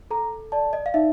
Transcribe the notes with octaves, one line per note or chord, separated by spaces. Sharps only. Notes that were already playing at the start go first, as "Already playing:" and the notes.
A4 A#5
D5 A5
D#5
F5
D#4 E5